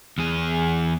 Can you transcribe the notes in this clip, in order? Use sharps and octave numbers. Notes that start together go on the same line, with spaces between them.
E2 G#4